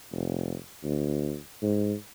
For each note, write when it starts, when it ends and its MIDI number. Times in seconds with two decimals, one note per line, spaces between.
0.12 0.56 29
0.83 1.37 38
1.62 1.94 44